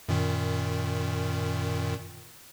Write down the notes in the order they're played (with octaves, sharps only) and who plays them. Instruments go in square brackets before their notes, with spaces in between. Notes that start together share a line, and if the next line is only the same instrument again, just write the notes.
[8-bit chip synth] F#2 A#2 D#3